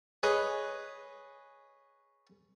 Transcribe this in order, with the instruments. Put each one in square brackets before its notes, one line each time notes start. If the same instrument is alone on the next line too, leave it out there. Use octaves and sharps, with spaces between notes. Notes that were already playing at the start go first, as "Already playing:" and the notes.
[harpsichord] G#4 B4 C#5 D#5